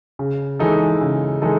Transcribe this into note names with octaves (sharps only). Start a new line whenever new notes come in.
C#3
E3 G#3 D#4 A4
C#3
E3 G#3 D#4 A4